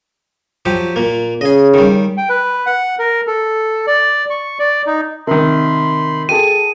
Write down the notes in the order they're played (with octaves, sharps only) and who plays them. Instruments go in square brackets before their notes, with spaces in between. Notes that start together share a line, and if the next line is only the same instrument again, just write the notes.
[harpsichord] F3 F#3 G4
A#2 A#3
[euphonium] C#3 [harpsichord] G#4 D#5
[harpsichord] D#3 G3
[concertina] G5
B4
F#5
A#4
A4
D5
C#6
D5
D#4
[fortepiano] C3 D#3 [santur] A#4 [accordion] B5 C6
[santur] G#4 A4 G5 [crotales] D#7